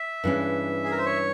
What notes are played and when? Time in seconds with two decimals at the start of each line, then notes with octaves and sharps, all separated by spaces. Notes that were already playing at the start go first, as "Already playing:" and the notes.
Already playing: E5
0.24 G2 E3 G#3 C#4
0.84 G#4
0.91 A#4
0.98 C5
1.06 C#5